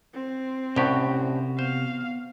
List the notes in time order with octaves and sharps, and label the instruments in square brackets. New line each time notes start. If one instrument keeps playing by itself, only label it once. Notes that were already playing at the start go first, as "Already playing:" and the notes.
[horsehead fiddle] C4
[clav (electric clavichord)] C2 A2 G4 [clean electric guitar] C3 F#4 [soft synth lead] C#4
[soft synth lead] B3 [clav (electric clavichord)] C5 [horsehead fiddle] F5